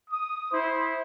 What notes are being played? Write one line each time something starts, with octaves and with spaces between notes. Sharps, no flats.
D#6
E4 C5